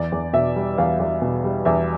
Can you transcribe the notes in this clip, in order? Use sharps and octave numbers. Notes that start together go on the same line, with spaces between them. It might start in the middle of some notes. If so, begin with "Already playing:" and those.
Already playing: E2 D5
E2
B2 E5
G3
E2 F5
E2
B2
G3
E2 E5